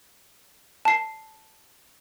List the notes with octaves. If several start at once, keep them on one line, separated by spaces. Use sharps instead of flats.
A5 C7